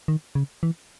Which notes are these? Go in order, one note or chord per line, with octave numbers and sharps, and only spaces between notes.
D#3
C#3
E3